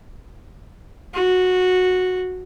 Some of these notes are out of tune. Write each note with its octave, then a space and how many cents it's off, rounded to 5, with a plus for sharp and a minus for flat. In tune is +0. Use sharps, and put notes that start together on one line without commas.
F#4 -10